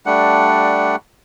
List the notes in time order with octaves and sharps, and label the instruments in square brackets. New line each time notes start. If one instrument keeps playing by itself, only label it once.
[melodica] G3 A3 D4 F#5